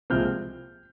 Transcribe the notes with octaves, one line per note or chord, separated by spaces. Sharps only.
C2 A#2 F3 G#3 C4 F6 G6